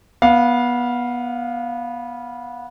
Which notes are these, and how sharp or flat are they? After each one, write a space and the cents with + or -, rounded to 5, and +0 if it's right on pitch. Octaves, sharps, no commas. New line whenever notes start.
B3 -20 F5 +0